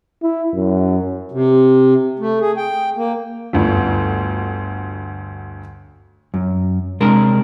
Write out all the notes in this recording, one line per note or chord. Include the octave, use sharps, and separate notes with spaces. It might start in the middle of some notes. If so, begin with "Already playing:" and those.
E4
F#2
C3
A3
G#4
G5
A#3
G1 D2
F#2
C3 G#3 D4 A#4